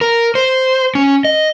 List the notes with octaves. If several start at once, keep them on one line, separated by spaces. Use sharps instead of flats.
A#4
C5
C#4
D#5